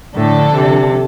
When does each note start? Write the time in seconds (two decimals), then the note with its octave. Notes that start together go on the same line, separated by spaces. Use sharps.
0.15 A2 D3 F3 D4 A4
0.54 C3